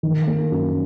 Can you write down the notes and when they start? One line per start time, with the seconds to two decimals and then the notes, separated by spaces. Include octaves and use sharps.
0.03 D#3
0.27 A#3
0.51 F#2